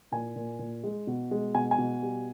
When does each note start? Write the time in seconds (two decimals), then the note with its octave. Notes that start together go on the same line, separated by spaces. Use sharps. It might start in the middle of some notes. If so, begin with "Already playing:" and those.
0.12 A#2 G#5
0.36 A#2
0.59 A#2
0.84 G#3
1.07 B2
1.31 G#3
1.54 B2 G#5
1.71 G#5
1.78 B2
2.02 G3